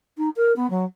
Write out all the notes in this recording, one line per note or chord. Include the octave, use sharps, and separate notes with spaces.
D#4
A#4
B3
F#3